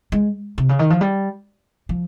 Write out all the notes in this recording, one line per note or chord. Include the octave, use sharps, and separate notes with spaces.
G#3
C3
C#3
D#3
F3
G3
F3